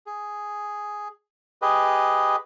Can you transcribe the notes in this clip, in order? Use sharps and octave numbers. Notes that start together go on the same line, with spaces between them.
G#4
G4 G#4 B4 D#5